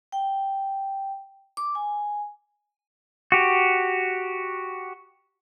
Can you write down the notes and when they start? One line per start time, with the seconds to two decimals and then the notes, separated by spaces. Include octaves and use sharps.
0.12 G5
1.57 D6
1.75 G#5
3.32 F#4 G4